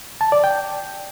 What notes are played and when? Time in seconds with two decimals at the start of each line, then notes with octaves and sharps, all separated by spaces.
0.21 A5
0.32 D5
0.44 G5